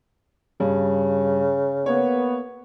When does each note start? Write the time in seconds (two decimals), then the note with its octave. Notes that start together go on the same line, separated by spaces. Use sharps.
0.60 G2 C#3
1.86 A#3 B3 C#5